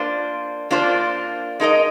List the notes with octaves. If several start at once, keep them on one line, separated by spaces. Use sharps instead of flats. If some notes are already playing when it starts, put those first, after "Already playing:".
Already playing: A#3 D4 F4 C5
A#3 D4 F4 C5
G#3 D#4 A#4 D#5